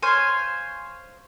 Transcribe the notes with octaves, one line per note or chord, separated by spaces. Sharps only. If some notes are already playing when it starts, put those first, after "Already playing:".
C5 C#5 F5 G#5